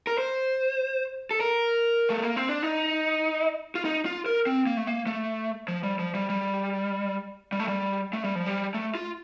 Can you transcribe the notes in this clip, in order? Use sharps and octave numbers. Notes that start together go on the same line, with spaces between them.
A#4
C5
A4
A#4
A3
A#3
C4
D4
D#4
F4
D#4
F4
A#4
C4
A#3
A3
A#3
A3
F3
G3
F3
G3
G3
G3
A3
G3
A3
G3
F3
G3
A3
F4